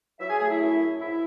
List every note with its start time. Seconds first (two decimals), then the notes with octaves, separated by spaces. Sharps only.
0.20 F#3 E4 E5
0.30 G#4 G#5
0.40 A3 G#4 G#5
0.50 E4 E5
0.60 F#2
0.80 F#2
1.00 G#2 E4 E5